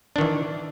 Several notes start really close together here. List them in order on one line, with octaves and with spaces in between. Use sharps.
D4 D#3 E3